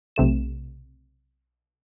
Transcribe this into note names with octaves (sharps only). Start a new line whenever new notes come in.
B1 C3 A3 E7